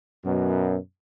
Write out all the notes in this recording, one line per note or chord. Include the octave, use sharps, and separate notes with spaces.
F#2 B2